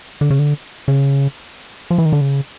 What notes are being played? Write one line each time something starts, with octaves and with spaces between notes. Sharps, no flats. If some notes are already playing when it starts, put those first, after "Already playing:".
D3
C#3
D3
C#3
F3
E3
D#3
D3
C#3